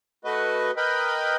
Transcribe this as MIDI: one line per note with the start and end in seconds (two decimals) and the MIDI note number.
0.25 0.71 57
0.25 0.71 66
0.25 0.71 71
0.25 0.71 75
0.77 1.37 70
0.77 1.37 71
0.77 1.37 75
0.77 1.37 79
0.77 1.37 83